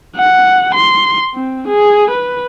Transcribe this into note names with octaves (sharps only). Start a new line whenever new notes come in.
F#5
C6
C4
G#4
B4